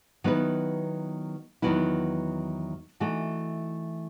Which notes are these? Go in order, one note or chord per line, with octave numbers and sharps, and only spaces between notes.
D#3 F#3 B3 E4 B4
E2 D#3 F#3 B3 E4
E3 A3 D#4 F#4